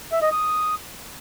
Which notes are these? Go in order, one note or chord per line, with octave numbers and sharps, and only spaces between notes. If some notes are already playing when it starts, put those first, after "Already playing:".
E5
D#5
D#6